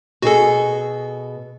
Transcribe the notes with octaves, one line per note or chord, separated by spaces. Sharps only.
B2 F#4 G#4 A4